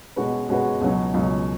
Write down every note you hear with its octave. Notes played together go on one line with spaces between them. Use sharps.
B2 G#3 C#4 F#4 B4
B2 G#3 C#4 F#4 B4
C#2 B2 F#3 C#4
C#2 B2 F#3 C#4